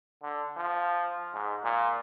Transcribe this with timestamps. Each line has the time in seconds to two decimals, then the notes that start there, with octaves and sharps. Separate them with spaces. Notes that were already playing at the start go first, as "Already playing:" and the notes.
0.23 D3
0.57 F3
1.34 G#2
1.63 A#2